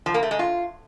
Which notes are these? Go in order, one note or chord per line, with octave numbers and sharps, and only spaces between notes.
F3
A#3
A3
G#3
F4